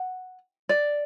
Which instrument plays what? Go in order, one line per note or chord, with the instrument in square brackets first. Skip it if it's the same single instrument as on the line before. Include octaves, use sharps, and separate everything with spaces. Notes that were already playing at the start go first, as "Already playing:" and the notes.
Already playing: [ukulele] F#5
D5